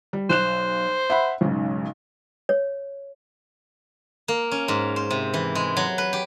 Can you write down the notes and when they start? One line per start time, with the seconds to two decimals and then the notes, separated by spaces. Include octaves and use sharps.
0.13 G3
0.30 B1 C5 F#6 E7
1.10 E5 F#5 B5
1.41 B1 G#2 C#3
2.49 C#5
4.28 A#3
4.52 C#4
4.68 G#2
4.96 C5
5.11 C3
5.34 E3
5.55 G#3
5.77 F#3
5.98 B4
6.13 G4